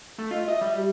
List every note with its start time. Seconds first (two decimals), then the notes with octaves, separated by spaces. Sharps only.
0.18 A3
0.31 F4 D#5
0.48 D#5 E5
0.61 G3
0.77 G4